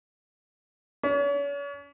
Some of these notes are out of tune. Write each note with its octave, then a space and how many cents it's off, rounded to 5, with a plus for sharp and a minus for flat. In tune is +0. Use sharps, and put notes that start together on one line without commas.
C#4 +40